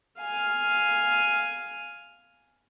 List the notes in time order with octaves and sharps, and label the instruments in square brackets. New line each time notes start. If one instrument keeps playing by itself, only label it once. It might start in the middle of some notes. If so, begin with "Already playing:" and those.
[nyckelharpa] F5 G#5